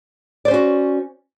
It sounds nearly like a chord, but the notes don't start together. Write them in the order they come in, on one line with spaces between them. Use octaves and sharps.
D5 C5 C#4 F#4